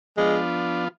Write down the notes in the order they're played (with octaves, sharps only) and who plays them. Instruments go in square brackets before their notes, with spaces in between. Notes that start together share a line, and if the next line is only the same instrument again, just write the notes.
[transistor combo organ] F3 B3 D4 F4 [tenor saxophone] G#3